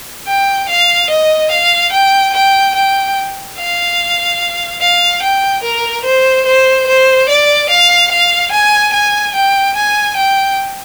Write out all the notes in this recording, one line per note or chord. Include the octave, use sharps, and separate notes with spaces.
G5
F5
D#5
F5
G5
G5
G5
F5
F5
G5
A#4
C5
C5
C5
D5
F5
F5
G#5
G#5
G5
G#5
G5